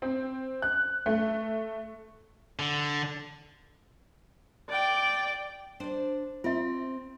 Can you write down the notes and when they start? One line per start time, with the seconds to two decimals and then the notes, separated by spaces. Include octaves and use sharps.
0.02 C4
0.62 F#6
1.06 A3
2.59 D3
4.69 D5 G5
5.80 D4 C5 D5
6.44 C4 F4 E5